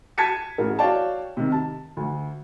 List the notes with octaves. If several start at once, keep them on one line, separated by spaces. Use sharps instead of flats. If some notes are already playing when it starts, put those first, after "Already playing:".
A5 G#6 B6 C#7 D#7
A1 G#4 A#4
F#4 C#5 D5 F5 G5 A5
C3 D#3
A5
D2